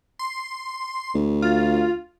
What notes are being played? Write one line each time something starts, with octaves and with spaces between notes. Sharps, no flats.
C6
D2
F4